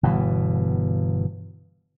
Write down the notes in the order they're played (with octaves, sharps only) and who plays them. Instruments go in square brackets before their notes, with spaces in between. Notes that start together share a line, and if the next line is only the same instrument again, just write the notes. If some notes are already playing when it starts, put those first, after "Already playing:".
[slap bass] G1 B2 E3